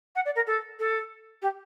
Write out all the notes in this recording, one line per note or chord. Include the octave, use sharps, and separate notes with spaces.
F#5
D5
A#4
A4
A4
G4